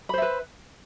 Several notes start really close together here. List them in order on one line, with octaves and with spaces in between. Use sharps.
B5 C5 E5 B4